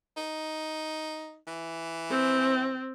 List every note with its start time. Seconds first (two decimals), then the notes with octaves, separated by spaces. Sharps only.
0.17 D#4
1.47 E3
2.11 C4